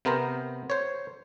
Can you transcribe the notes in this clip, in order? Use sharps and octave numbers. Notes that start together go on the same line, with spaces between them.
C3 B3 A#4 C5 A#5
C5 C#5